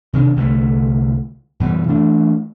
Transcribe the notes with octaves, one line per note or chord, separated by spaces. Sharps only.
C3 D#3 C4 D4
C2 D3 G#3 A3
F#2 B2 E3 G3
E3 A3 D4